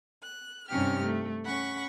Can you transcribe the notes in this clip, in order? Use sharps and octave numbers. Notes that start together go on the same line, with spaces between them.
F#6
G2 C3 C#4 D#4 G4 F6
A3
C#4 F#5 B5 C#6